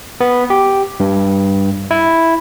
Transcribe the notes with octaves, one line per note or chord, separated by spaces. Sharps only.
B3
G4
G2
E4